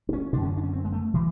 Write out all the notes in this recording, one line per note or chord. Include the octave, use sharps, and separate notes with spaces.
D4
C#4
F#2 D3 D4
C#4
D4
C#4
C4
G#3
A3
E3